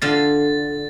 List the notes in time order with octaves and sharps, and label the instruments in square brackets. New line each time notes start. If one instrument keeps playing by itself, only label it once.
[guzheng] D3 F4 C6 [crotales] A6